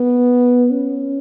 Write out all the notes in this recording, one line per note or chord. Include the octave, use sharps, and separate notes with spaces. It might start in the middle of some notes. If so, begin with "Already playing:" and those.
Already playing: B3
C#4